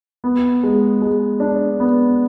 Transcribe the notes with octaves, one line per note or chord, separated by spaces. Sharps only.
B3
G#3
G#3
D4
B3